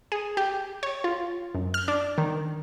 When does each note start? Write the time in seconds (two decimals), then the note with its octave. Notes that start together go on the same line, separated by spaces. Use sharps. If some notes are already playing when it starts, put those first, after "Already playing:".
0.12 G#4
0.37 G4
0.83 C#5
1.04 F4
1.55 F#2
1.74 F6
1.88 D4
2.18 D#3